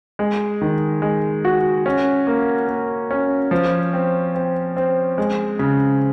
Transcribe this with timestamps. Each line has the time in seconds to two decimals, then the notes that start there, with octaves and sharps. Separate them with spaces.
0.19 G#3
0.61 D#3
1.02 G#3
1.45 F#4
1.86 C#4
2.27 A#3
2.68 A#3
3.11 C#4
3.51 F3
3.93 C4
4.35 C4
4.77 C4
5.18 G#3
5.59 C#3